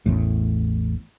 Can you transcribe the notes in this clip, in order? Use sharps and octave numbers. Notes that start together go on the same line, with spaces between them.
A1 E2 A2